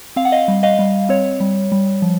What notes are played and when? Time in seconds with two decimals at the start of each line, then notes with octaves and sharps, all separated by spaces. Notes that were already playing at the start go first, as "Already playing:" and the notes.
0.16 C4 F5
0.25 F#5
0.32 D#5 F5
0.48 G3
0.63 D#5 F5
0.79 G3
1.09 C4 C#5
1.40 G3
1.72 G3
2.02 F3